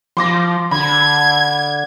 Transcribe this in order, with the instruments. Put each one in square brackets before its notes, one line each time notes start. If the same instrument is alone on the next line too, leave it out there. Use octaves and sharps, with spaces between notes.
[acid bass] F3 [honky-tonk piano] C6 D6 A#6
[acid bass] D3 [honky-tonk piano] B5 [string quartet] G#6